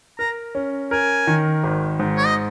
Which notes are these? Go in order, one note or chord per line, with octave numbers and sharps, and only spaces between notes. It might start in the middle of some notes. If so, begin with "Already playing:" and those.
A#4 A#5
C#4
A#4 G#5
D#3
G#1
G#2
C#5
D#5